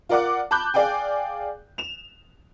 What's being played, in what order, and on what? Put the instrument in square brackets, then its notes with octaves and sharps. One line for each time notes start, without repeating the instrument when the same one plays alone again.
[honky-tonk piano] F4 A#4 D5 F#5 D6
A5 B5 D6 F#6 G6
G#4 D5 F5 G5 G#5
E7 F7